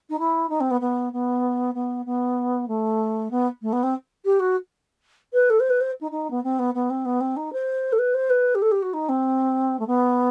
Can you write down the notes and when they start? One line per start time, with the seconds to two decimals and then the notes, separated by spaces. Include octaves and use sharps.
0.10 D#4
0.19 E4
0.49 D#4
0.60 C4
0.71 B3
0.81 B3
1.13 B3
1.74 B3
2.06 B3
2.68 A3
3.31 B3
3.62 A3
3.72 B3
3.83 C4
4.25 G4
4.40 F#4
5.33 B4
5.50 A4
5.60 C5
5.70 B4
5.81 C5
6.01 D#4
6.11 D#4
6.31 B3
6.44 C4
6.59 B3
6.74 B3
6.90 C4
7.05 B3
7.21 C4
7.36 D#4
7.53 C5
7.92 A4
7.99 B4
8.14 C5
8.30 B4
8.55 G4
8.62 A4
8.71 G4
8.82 F#4
8.93 D#4
9.09 C4
9.79 A3
9.87 B3